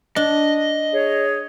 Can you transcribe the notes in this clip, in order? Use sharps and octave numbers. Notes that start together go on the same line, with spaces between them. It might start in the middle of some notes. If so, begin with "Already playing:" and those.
D4 D#5
G#4 C#5